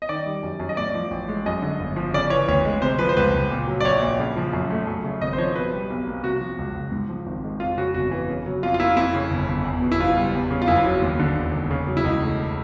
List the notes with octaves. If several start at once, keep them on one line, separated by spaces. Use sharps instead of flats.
D#5
D#3 D5
G3
F#2
F#2
D#5
A2 D5
F3
A1
G#3
F#2 D#5
D3
G1
F3
C#3 D5
E3 C#5
D2 C#5
G#3
C3 C5
F3 B4
C5
C#2 B4
C#2
A#2
F#3
D5
A#1 C#5
A#1
C#3
F3
F#2
A3
F#2
C#3
G#1 D#5
C5
F3 C#5
B2 B4
G3
B1
A#3
C3 F#4
F3
C#2
C#2
G#2
F3
G#1
G#3
F2 F4
C#3 F#4
G1 F#4
E3
C#3
F#3
F2 F4
F4
A#3 E4
F2 E4
C#3
G1
G1
E2
B2
E4
F#1 F4
G3
E2
C#3
F4
F#1 E4
F#3
D#2
D3
E1
E1
C#3
F#3
E4
C#2 D#4
A3